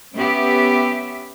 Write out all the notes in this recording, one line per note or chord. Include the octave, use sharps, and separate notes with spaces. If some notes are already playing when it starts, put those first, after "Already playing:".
B3 C#4 G4 E5